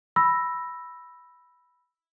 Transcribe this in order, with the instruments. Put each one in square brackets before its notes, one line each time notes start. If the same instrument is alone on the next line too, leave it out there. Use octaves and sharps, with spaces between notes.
[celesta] B5 E6 A#6